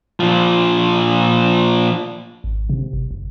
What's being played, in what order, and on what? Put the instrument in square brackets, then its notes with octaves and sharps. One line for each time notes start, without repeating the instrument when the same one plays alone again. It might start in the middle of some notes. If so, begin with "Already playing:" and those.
[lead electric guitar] A#2 F3
[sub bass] G#1
C3
G1
F#1